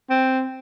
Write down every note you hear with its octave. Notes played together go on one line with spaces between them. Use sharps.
C4